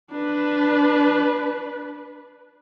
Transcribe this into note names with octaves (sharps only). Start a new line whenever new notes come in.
D4 B4